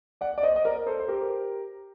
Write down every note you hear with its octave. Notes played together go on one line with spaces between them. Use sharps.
D5 F#5
D5
C5 D#5
D#5
A#4 D5
A4 C5
C5
G4 A#4